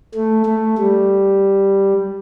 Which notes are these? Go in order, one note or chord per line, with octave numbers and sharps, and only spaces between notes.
A3
A3
G3